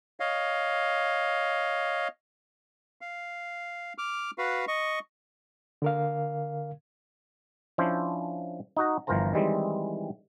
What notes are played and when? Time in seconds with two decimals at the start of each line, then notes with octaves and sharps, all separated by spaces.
0.20 C#5 D#5 F5
3.01 F5
3.98 D6 F6
4.38 F#4 B4 F5
4.68 D#5 C#6
5.82 D3 A#4 F5
7.78 F3 C#4 D4 E4 C5
8.77 D#4 F#4 A#5
9.07 G1 E3 F3 A#4 C5 A#5
9.33 D#3 E3 G3 G#3 C4